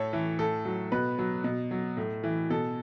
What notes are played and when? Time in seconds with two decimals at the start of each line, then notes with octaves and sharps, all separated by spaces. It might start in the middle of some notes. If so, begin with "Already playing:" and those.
Already playing: A2 A4 C#5
0.13 E3
0.39 A2 A4
0.65 F#3
0.92 B2 B4
1.18 F#3
1.44 B2
1.71 F#3
1.97 A2
2.23 E3
2.50 B2 A4